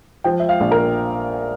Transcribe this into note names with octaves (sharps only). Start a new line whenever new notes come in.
F3 G5
E5
F5
A#1
A#4